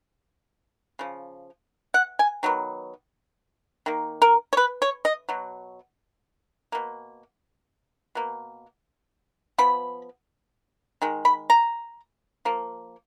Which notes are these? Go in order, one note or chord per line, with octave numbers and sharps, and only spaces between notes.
C#3 F3
F#5
G#5
D#3 F#3 B3
D#3 A#3
A#4
C#5
B4
C#5
D#5
B2 F#3
B2 A#3
B2 A#3
F3 B3 B5
D#3 G#3
B5
A#5
F3 A#3